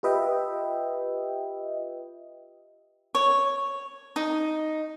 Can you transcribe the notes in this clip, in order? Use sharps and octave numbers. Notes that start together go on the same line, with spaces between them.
F4 G4 B4 D#5 E5 G5
C#5
D#4